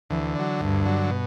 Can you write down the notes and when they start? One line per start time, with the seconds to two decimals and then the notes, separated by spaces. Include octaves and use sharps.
0.10 D2 E3
0.35 D3 F#3
0.61 D2 G2
0.86 D3 F#3
1.10 B2